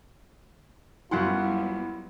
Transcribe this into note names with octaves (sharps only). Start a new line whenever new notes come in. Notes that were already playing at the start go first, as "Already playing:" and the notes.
F#2 F#3 G3 B3 E4 F4 F#5 C6